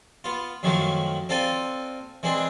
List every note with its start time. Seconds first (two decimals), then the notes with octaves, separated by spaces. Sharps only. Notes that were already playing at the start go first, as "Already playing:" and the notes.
0.24 B3 F4
0.63 F#2 D#3 F3 F#3 A3
1.29 C4 F4 A4 D5 G#5
2.23 E3 G#3 C4 D4